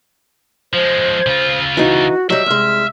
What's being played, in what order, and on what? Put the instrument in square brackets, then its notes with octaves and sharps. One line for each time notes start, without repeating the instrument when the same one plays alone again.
[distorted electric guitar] F3 G#3 [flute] C5
[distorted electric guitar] C#3 F4
[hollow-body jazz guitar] E3 D#4 [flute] F#4
[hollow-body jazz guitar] F#3 G3 [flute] D#5 [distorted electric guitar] E5
[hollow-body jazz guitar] C2 G#3 [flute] F6